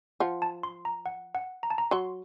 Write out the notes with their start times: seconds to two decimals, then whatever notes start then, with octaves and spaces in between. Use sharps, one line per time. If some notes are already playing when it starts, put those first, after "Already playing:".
0.20 F3 F4 F#5
0.42 A5
0.63 C6
0.85 A#5
1.06 F#5
1.35 F#5
1.63 A#5
1.70 A5
1.78 A#5
1.91 F#3 F#4 C6